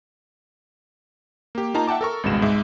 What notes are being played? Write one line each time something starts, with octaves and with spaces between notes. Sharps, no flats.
A#3 G4
A#3 D#4 F4 A5 A#5
E5 F#5 G5 A5 D6
A4 A#4 C#6
G#1 C#2 G2 B2 G#3 E7
G#2 G#3 E5